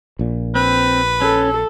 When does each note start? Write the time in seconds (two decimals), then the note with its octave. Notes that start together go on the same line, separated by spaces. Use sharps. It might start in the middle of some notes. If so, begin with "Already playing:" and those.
0.19 A#1 A#2
0.55 C4 B4
1.22 C#4 A4